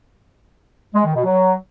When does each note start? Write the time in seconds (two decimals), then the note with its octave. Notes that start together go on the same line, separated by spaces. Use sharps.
0.94 G#3
1.04 D#3
1.15 B2
1.25 F#3